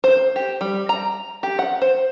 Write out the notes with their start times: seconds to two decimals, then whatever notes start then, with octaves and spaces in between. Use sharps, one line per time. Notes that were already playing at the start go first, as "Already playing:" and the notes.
0.04 C5
0.36 G4
0.61 G3
0.89 A#5
1.43 G4
1.59 F#5
1.82 C5